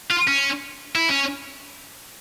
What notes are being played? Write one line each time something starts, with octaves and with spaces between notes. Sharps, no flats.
F4
C#4
E4
C#4